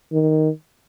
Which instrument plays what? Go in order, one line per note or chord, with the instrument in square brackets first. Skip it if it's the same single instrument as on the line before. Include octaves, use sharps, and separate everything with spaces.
[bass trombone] D#3